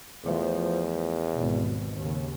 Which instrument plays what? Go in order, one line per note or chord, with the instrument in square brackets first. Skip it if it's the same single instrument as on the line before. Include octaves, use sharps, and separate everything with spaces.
[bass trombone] E2 [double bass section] F3 A3
[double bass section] G#1 D#2 B2
D#2 C#3